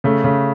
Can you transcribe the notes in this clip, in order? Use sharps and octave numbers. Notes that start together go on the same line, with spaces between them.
C#3 A3
C#3